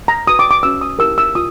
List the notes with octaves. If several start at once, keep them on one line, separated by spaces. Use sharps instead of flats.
A#5
F#4 B4 D#6
D6
D6
C#4 F#4 B4 E6
D#6
E4 G4 A#4 E6
E6
F4 D#6